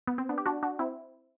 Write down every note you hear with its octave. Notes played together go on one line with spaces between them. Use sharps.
B3
C4
B3 D4
G4
D4 F#4
D4 F#4
C4 E4